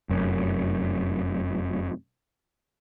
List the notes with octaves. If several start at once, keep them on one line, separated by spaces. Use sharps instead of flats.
F1 F#2